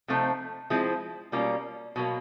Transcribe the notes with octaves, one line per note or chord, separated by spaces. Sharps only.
C3 F3 A3 C4 D#4
F3 G#3 C4 E4
B2 G3 A#3 C#4 F4
B2 F#3 A#3